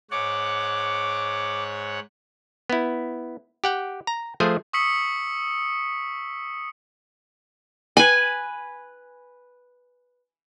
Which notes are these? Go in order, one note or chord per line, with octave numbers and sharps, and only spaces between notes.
G#2 C#5 F#5 D6
B3 E4
G4 F#5 G5
A#5
F3 A3 G#4 C5 G#5
C#6 D#6 E6 B6 C#7 F#7
B4 G#5